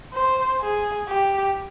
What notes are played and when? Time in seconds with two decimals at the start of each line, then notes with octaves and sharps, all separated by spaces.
0.13 C5
0.61 G#4
1.08 G4